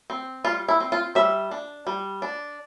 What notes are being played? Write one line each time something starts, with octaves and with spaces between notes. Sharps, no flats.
C4
G3 F4
E4
C4
F4
G3 E5
D4
G3
D4